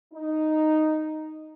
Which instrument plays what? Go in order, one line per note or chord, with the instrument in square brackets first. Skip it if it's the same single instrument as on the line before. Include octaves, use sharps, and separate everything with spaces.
[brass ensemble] D#4